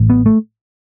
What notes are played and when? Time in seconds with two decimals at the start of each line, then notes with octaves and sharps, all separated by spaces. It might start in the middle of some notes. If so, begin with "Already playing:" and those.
Already playing: A1 A2
0.10 B3
0.26 A3